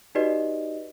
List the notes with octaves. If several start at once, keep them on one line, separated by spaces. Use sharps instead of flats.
D#4 F#4 G4 B4 D5 D#5